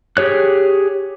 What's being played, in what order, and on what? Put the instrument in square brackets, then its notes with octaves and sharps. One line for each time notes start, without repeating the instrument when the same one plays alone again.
[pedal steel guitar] G4 G#4 C#5 F#6